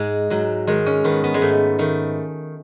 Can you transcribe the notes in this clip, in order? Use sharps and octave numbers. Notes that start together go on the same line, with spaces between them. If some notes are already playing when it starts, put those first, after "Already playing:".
Already playing: G#2 G#3
G#2 F#3
D#3 G#3
C#4
D#3 B3
B3
G#3
G#2 A3
D#3 A3